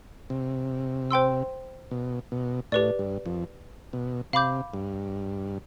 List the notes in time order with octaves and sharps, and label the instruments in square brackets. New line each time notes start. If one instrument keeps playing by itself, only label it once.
[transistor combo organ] C3
[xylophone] C5 G5 C6 E6
[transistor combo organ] B2
B2
[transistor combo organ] A2 [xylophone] G4 B4 D5
[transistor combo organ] G2
F2
B2
[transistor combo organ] C3 [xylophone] F5 B5 D6 G6
[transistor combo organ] G2